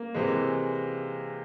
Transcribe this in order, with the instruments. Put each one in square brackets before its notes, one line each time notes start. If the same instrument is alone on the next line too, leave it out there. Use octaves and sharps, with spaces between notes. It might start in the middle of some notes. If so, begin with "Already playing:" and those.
Already playing: [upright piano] A#3
[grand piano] C3 E3 G#3